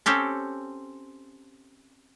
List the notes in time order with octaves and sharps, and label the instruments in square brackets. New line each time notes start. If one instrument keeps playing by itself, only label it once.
[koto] C4 C#4 G4 A4